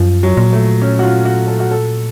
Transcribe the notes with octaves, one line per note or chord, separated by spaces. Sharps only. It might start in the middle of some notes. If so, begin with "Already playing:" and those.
Already playing: F#2 F3
F#3
A#2
A3
C#4
F#4
F4
F#4
A4
F#4
A4